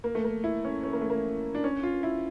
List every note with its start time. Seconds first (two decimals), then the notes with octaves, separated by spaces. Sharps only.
0.04 A#3
0.15 A3
0.24 A#3
0.44 E4
0.65 C#4
0.83 C#4
0.93 A#3
1.01 A3
1.10 A#3
1.55 D4
1.64 C#4
1.83 F4
2.03 E4